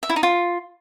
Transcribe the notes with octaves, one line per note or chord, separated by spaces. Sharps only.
E5
E4
D#4
F4